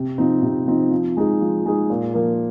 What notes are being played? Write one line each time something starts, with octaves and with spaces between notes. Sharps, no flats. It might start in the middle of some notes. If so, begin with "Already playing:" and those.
Already playing: C3
F3 C4 D#4
C3
F3 C4 D#4
F3
G#3 D#4 G#4
F3
G#3 D#4 G#4
A#2
F3 A#3